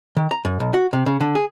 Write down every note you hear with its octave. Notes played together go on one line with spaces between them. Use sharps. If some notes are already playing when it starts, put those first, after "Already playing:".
D#3
A#5
F#2
B1
F#4
C3
C#3
D3
G#4